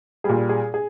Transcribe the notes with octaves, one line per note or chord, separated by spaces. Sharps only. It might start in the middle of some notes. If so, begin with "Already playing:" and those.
A#2 G3 G#4
G#4
G#4